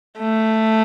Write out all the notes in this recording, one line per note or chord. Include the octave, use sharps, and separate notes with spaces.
A3